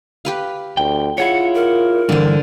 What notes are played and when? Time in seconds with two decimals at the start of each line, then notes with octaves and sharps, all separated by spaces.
0.25 G4 B4 F5
0.77 D2 G5
1.18 E4 F4 G#4 C#5 F#5
1.54 A#4
2.09 G2 D3 E3 C5